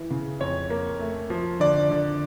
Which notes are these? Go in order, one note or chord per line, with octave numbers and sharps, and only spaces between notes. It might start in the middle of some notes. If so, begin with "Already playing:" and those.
Already playing: E3
C#3
F2 C#5
A#3
A3
F3
D3 D5
D3